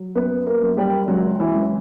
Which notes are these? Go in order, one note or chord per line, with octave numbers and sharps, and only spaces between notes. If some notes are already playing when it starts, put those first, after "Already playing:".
Already playing: F#3
F#2 B3 B4
A#3 A#4
F#2
G3 G4
C#2 F#3 F#4
E3 E4
C#2